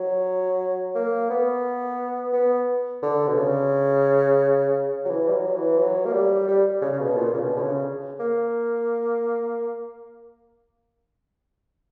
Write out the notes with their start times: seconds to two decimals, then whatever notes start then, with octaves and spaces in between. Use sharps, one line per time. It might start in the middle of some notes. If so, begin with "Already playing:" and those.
Already playing: F#3
0.95 A#3
1.30 B3
2.33 B3
3.02 D3
3.27 B2
3.37 C#3
5.05 F#3
5.10 E3
5.28 G3
5.32 F#3
5.55 E3
5.78 F#3
6.05 A#3
6.13 G3
6.48 G3
6.81 C#3
6.93 C#3
6.99 B2
7.16 A#2
7.34 C#3
7.40 B2
7.56 D3
7.62 C#3
8.20 A#3